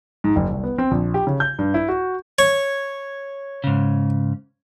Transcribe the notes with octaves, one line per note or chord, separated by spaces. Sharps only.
G#2
F#1
C2
B3
C4
A#1
G4
C#3
G6
G2
E4
F#4
C#5
G#2 C#3